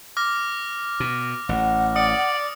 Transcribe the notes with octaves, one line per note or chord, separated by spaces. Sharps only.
D6 F6 A#6
B2
A1 F#5
D5 D#6 C#7